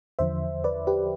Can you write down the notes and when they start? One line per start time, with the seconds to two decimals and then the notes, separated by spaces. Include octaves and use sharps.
0.19 E2 D3 F3 C5 E5
0.64 B4 D5
0.87 G4 B4